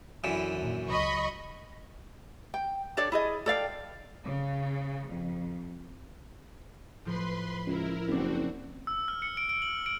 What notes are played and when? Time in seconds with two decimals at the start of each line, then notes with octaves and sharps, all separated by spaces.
0.24 F#2 D3 E3 E4
0.58 D#2 A#2
0.89 C#2 F#3 D#5 B5 C#6
2.54 G5
2.97 D4 A4 C#5 D5
3.12 E4 G#4 D#5
3.46 A4 D5 F5 G5
4.25 C#3
5.08 F2
7.05 A2 F3 B4 B5 C6
7.67 C#2 E4 A#4
8.08 F#1 B3 C4 D4 F#4
8.87 E6
9.08 F6
9.22 C#7
9.37 D7
9.49 D7
9.62 F#7
9.86 D7